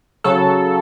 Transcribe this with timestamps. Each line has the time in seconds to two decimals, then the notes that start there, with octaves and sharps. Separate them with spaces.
0.24 C#3 F#3 A4